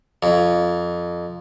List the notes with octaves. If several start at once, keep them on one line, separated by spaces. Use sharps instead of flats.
F2